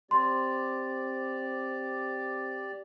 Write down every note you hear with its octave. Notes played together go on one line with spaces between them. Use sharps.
C4 G4 D5 C6